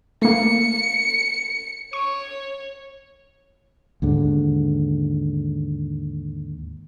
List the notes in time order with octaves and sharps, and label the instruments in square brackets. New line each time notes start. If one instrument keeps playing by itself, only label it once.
[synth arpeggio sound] A3 A#3 [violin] C#7
[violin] C#5 [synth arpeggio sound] C#6
[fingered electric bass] D#2 G#2 D3